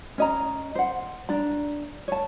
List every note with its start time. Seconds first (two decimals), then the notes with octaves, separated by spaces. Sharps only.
0.18 C#4 D#5 A#5
0.75 C5 F#5
1.29 D4 D5 A#5
2.08 C#5 A5